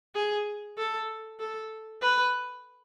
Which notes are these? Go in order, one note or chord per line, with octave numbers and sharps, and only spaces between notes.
G#4
A4
A4
B4